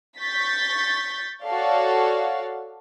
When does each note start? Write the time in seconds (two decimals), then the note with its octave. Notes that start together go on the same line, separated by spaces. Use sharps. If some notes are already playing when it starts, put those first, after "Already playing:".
0.19 C#6 G6 A6 B6
1.42 F#4 A4 C#5 D5 F5